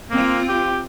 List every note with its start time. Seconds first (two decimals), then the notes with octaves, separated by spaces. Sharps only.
0.10 A#3 C4 F4
0.49 G4